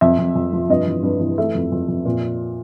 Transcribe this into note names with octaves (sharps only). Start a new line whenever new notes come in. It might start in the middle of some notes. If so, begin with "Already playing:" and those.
F2 E5
F2
F2
F3
G2 D#5
E3
G2
E3
A3 E5
F2
F2
F2
A#2